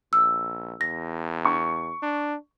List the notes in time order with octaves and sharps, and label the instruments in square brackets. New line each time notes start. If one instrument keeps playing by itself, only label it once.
[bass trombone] A#1 [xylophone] E6
[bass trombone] E2 [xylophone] A#6
[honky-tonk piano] C#6
[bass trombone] D4